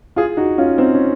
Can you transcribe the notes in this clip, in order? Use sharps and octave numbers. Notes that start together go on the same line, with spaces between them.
F4 G#4
D#4 F#4
C#4 F4
C4 D#4
C#4